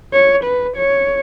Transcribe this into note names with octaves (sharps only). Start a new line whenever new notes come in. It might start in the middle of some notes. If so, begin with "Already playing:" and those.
C#5
B4
C#5